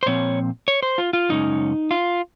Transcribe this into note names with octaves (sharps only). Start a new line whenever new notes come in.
C5
A#2 F3 C4 C#5
C#5
C5
F4
F4
F#2 C#3 G#3 C#4 D#4
F4